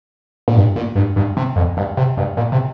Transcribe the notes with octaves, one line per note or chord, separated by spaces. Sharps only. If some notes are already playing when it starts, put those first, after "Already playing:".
A#2
G2
A#2
G2
G2
C3
F2
G2
C3
G2
A#2
C3